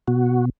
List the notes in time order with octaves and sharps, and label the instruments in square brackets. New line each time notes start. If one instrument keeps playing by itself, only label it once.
[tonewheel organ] B2 F#4